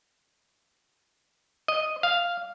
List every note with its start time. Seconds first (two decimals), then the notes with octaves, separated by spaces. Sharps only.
1.68 D#5
2.03 F5